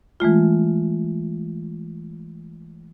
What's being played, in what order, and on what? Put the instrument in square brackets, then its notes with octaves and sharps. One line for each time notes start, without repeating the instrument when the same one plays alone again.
[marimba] E3 G#3 A3 F4